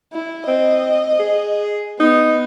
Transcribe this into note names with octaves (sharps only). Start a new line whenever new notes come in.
E4
C4 D#5
G#4
B3 D#4